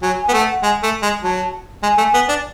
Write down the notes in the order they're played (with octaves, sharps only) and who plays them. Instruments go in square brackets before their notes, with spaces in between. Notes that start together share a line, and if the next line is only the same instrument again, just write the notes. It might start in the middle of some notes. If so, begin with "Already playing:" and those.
[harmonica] F#3 [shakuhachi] G#5
[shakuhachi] G#5
[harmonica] B3
[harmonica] A3 [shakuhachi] F#5
[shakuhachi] F#5
[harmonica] G#3 [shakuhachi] G#5
[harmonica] A3
G#3
[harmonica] F#3 [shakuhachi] A5
[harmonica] G#3 [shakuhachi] G#5
[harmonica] A3
B3
D4